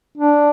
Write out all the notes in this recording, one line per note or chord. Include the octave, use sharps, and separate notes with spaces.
D4